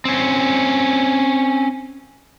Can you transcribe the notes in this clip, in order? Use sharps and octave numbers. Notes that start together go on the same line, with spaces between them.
C4 C#4